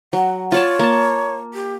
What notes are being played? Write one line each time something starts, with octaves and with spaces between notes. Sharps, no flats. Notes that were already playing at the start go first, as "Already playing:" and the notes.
F#3 F#5
F4 C#5 D5 A5
A#3 A5
G4